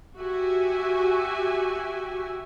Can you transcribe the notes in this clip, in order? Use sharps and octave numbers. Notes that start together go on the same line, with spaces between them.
F#4 G4 E5 G#5